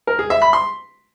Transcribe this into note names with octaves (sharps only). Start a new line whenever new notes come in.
A#4
G#4
E5
B5
C6